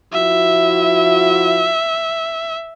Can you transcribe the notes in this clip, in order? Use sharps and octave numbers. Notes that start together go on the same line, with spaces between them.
F3 E4 F#4 E5